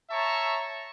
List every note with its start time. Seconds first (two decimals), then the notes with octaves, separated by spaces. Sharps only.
0.11 C#5 E5 A5 A#5 C#6